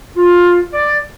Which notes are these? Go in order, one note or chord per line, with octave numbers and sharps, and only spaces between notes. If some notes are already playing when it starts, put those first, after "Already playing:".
F4
D5